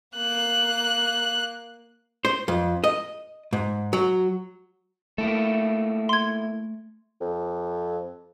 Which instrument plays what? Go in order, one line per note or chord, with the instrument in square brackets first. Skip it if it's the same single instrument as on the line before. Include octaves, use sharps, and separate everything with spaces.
[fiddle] A#3 F#6
[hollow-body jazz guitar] C5
F2
D#5
G#2
F#3
[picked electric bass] A3 [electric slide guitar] A#3 E4 A4
[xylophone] C6 G#6
[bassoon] F2